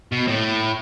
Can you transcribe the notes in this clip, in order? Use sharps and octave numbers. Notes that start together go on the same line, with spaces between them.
B2
A2